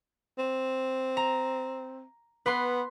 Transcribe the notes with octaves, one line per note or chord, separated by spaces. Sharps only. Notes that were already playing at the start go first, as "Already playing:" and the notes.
C4
A#5
B3 B4 C6